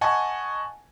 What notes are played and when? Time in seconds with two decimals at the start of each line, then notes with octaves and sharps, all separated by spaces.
0.01 D#5 F#5 G#5 A5 C#6